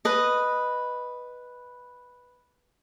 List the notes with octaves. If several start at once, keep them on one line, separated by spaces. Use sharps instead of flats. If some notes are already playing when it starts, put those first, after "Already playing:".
B4 D#5